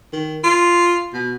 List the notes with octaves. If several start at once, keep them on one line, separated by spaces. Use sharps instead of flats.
D#3
F4
B2